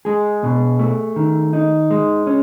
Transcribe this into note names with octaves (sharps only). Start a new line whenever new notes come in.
G#3 G#4
B2
A3
D#3
D#4
G#3
C#4